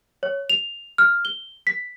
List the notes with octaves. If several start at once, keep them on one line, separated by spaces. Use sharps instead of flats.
C#5
F7
F6
G7
B6